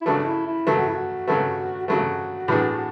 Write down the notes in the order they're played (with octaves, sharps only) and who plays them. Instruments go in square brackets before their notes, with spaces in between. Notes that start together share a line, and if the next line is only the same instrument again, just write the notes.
[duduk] E4
[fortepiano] C#3 F#3 A3 [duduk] D4
[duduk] E4
E4
[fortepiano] C#3 F#3 A3
[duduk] F#4
E4
F#4
[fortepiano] C#3 F#3 A3
[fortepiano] C#3 F#3 A3 [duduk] F#4
[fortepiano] A2 F#3 B3 D4 G#4